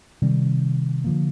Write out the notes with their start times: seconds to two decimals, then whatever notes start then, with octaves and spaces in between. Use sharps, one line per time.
0.22 C3 D#3 G3 C4
1.04 D3 F3 A#3